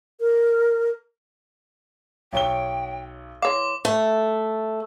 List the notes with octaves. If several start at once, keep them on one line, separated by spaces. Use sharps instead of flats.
A#4
B1 C#5 G5 G7
E3 C#5 F5 C6 D6
A3